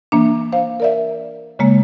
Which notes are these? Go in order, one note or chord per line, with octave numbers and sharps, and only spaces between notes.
E3 A#3 D4
C5 F5
A#4 D5 E5
C#3 G#3 A#3